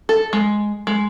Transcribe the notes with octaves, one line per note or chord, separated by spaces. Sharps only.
A4
G#3
G#3